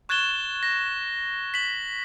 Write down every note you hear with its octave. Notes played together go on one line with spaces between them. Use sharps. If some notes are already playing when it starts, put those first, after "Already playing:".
C#6 F#6 G#6 A6 E7 G7
A#6
B6 F#7